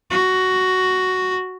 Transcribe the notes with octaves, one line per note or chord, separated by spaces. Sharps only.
F#4